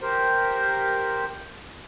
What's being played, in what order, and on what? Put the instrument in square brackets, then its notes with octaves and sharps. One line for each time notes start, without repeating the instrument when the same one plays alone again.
[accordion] G4 A#4 C5